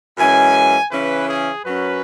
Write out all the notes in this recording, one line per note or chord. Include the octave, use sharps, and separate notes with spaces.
F#2 E3 G#3 C#4 G#5
C#3 E3 C#4 B4
G#4
F#2 F#3 C#4 B4